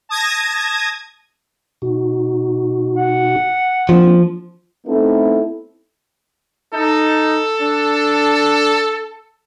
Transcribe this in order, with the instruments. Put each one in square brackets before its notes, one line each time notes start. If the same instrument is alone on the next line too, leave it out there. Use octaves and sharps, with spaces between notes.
[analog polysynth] A5 D#6 G#6 A#6
[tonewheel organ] B2 D#4 F#4
[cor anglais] F#5
[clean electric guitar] F3 [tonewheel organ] A#3 C4 D4
[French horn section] A3 B3 C4 D#4 E4 A4
[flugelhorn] D#4 [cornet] A4
[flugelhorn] D4